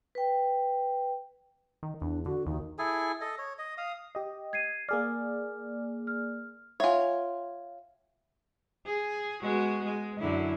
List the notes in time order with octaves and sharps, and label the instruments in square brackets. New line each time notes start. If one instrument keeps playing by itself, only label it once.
[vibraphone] B4 G5
[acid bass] D#3
[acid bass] E2 [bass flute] D4
[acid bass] D3 [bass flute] F#4
[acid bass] D#2 [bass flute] D#3
[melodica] E4 G#4 A4 G#5
A4 D#5
C#5
D#5
F5 D#6
[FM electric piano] G4 D#5
[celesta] G#6 C7 D#7
[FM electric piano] A#3 G#4 D5 [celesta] F6
[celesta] F6
[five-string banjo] F4 C#5 [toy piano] E5 F#5 G#5
[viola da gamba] G#4
G#3 B3 F#4
G#3
F#2 D3 E4